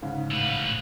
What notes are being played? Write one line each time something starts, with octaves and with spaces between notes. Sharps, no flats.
G#2 C#3
A2 B4